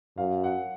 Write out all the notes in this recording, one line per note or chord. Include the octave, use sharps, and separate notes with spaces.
F#2 F5
F#5